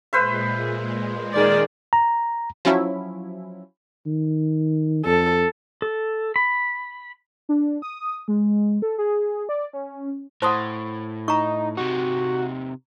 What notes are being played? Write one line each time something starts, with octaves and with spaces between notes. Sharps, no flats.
A#2 G#3 B4 C5 E5
D#3 G#4 D5
A#5
F3 F#3 C#4 E4
D#3
F2 A4
A4
B5
D4
D#6
G#3
A4
G#4
D5
C#4
A2 C5 F#5 A5 C6 D#6
D#4 A#5 C#6
C3 D#4 F#4